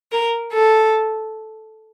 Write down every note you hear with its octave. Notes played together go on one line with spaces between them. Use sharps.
A#4
A4